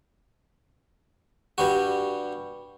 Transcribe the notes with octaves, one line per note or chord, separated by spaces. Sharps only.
G2 G3 F#4